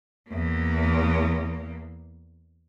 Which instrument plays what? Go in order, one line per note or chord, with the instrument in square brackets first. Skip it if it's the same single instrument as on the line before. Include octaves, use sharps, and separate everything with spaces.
[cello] E2 A#3